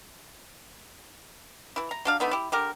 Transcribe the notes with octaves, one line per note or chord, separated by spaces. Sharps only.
E3 E4
A#5
F#3 D4 F5
D3 A3 B3 D#4
E4 G4
D3 G4 A#4